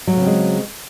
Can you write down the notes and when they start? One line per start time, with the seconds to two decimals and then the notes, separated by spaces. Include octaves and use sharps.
0.07 F#3
0.12 A3
0.17 C#3
0.22 C4
0.26 G#3